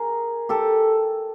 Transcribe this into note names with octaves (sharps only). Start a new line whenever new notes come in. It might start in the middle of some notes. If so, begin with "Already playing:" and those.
Already playing: G#4 A#4
G4 A4